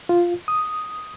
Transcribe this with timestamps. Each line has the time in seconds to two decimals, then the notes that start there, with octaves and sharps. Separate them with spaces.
0.09 F4
0.48 D#6